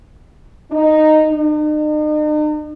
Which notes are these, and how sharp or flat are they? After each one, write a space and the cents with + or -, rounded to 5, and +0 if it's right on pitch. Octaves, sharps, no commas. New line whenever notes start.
D#4 -10
D#4 -45